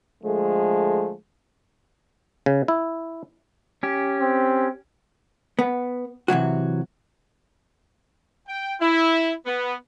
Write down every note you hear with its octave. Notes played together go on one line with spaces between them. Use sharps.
D3 F3 G#3 A3
C#3
E4
C#4 G4
C4
B3
C3 E3 F#3 F#4
G5
E4
B3